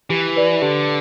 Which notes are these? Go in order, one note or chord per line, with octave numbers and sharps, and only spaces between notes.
E3 G4
B4 D5
D3 G4